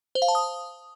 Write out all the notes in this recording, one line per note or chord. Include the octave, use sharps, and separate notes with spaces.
C5
F5
A5
D#6